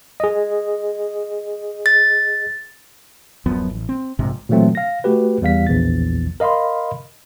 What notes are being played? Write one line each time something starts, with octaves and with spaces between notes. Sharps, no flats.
G#4 D#5
A6
D1 F#2 F3 B3
A1
C4
A#1 G#2 C3
A#2 E3 F#3 A3 C4
F5 A#6
A3 F#4 G4 B4
E2 G3 F5 B6
A#1 E2 A6
A#4 D#5 F5 B5 C6